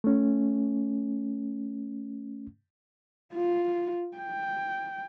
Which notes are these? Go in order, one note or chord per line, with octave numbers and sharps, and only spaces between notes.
A3 C#4
F4
G5